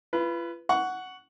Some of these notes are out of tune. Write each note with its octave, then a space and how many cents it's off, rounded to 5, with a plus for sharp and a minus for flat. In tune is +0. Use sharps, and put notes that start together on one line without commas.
F4 -40 B4 +0
F#5 +0 C#6 +20